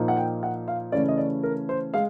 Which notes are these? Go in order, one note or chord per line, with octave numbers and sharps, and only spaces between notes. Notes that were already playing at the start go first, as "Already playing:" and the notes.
Already playing: A#2 F3 A#3 D#4
F#5
G5
F#5
F5
C#3 E3 A3 C#4 D5
D#5
D5
A#4
C5
G#3 F5